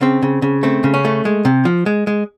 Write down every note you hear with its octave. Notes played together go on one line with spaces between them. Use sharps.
C#3 C4
C#3
C#3
A3 C4
C#3
C#4
A3
G#3
C3
F3
G#3
G#3